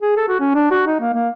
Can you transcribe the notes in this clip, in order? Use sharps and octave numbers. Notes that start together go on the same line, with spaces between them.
G#4
A4
F#4
C#4
D4
F#4
D#4
A#3
A#3